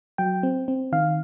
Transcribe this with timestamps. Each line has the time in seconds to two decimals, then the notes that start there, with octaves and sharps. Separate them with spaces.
0.18 F#3 G5
0.43 C4
0.68 C4
0.92 D#3 F5